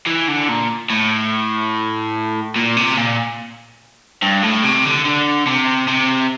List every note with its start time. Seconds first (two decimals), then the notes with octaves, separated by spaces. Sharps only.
0.07 E3
0.28 D3
0.49 A#2
0.90 A2
2.56 A#2
2.77 C3
2.97 A#2
4.22 G2
4.42 A2
4.64 C3
4.85 D3
5.04 D3
5.46 C3
5.88 C3